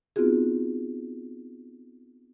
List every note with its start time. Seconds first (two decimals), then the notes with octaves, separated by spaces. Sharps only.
0.16 B3 C4 D#4 F4 F#4 G#4